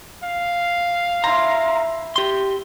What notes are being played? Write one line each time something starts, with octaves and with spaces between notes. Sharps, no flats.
F5
E4 C5 A#5
G4 C6